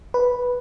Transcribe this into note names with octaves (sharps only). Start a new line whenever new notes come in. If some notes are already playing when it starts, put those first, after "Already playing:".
B4